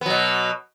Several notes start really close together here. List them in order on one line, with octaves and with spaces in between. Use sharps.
B3 F#3 B2